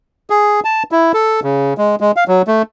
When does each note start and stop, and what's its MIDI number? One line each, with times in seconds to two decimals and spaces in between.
0.30 0.60 68
0.64 0.83 81
0.92 1.12 64
1.14 1.40 69
1.43 1.74 49
1.78 1.96 56
2.00 2.12 56
2.16 2.24 77
2.28 2.42 54
2.47 2.62 57